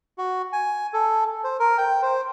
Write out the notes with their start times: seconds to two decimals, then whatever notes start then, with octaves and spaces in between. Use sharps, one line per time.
0.18 F#4
0.53 G#5
0.93 A4
1.44 C5
1.60 A#4
1.78 G5
2.02 C5